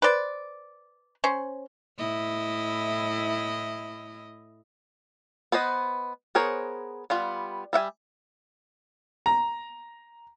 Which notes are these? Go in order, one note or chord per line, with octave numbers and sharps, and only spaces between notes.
B4 C5 D5
C#4 C5
A2 E4 D#5
B3 B4 C5 D#5
B3 G#4 A#4 C5 C#5
G3 B3 F4
G3 E5 F#5 G#5
A#5